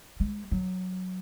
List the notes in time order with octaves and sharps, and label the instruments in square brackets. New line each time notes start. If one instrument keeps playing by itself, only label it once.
[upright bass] G#3
F#3